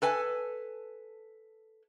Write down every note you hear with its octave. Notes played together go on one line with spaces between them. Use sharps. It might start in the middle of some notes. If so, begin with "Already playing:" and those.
A4 B4 G#5